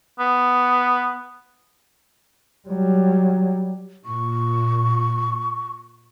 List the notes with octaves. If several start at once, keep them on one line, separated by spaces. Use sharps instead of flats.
B3
F#3 G3
A#2 C#6